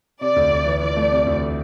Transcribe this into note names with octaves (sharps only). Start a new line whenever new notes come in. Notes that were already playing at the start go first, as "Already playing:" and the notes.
C3 D5
D2
D2
E3
E3 D5
A3
C3
D2